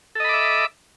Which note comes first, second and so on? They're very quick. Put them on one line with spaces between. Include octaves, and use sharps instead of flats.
A4 D#5 B5 D6 E5